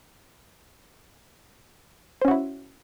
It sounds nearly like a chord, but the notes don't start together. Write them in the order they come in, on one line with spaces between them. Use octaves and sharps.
C5 C#4 F#4 E4